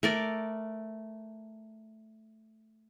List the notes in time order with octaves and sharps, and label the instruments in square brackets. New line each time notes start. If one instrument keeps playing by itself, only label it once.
[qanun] A3 A#4 D5